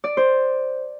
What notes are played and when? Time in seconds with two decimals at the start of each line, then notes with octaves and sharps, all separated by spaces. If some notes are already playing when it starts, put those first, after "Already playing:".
0.04 D5
0.17 C5